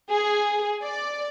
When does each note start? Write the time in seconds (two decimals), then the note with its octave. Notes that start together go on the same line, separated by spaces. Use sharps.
0.12 G#4
0.83 D5